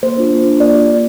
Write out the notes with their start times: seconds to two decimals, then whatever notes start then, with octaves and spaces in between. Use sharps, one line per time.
0.03 A#3 C5
0.17 D4 F4
0.31 A#3
0.46 D4 F4
0.60 A#3 D5
0.74 G4
0.88 A#3